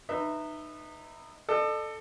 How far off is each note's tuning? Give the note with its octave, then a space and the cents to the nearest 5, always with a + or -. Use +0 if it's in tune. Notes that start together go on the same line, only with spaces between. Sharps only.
D#4 -25 B4 +0 E5 -10
A4 +0 D5 +45